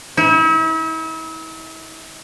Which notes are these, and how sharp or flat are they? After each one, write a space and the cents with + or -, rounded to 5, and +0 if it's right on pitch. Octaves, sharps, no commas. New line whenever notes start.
E4 -40